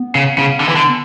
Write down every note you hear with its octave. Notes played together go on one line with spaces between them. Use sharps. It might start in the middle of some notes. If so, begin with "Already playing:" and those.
Already playing: B3
C#3
C#3
D3
E3
D3